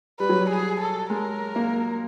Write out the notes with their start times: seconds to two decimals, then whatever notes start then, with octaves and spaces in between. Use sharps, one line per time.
0.20 G3 B4
0.29 F#3
0.39 G3
0.50 G#4
0.80 A4
1.10 G#3 A#4
1.56 A#3